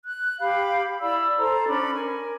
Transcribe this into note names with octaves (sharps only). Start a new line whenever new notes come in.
F#6
G4 F5 B5
E4 D5 B5 E6
A4 C5 A#5
C#4 D4 B5
A#4 G#5